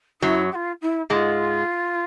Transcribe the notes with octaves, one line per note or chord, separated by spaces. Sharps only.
F#2 F#3 E4
G4
F4
E4
G#2 G#3 F4